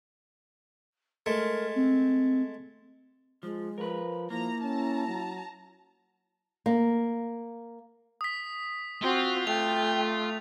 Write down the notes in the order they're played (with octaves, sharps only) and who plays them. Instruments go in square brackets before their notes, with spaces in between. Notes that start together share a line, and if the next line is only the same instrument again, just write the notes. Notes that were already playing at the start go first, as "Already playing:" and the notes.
[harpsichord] G#3 A3 [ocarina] A#4
[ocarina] C4
[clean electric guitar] F3 [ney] G#3
[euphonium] F3 [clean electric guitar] A#4 B4
[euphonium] F3 [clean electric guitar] A#3 [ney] E4 [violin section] A#5
[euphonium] C#4 [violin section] A5 A#5
[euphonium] F#3
[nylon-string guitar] A#3
[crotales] D#6 B6
[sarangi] C4 [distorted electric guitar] F4 [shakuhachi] F#4
[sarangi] A3 [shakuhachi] G5 [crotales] F7